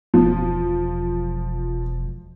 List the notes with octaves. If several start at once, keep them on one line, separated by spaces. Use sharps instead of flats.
E1 F3